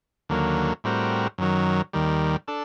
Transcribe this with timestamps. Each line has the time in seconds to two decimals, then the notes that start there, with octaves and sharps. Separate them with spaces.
0.29 D#2 D3 F#3 A#3
0.84 A2 G3 C4 F#4 A#4
1.38 F#2 D#3 F#3
1.93 D#2 D#3 G3
2.48 D4 A4